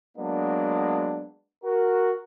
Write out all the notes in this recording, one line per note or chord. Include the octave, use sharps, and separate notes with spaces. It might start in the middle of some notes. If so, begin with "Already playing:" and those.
F#3 G#3 A#3 B3 D4
F#4 A#4